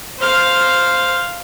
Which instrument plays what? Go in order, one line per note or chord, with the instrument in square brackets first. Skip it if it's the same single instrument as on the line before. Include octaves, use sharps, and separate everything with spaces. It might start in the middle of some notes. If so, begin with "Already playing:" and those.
[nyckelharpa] C5 F5